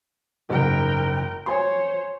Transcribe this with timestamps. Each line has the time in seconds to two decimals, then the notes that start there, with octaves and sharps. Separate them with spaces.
0.50 F#1 G#2 A#4 G5
1.46 C5 C#5 G#5 C6